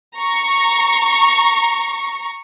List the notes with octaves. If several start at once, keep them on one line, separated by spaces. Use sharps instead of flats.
A#5 C#6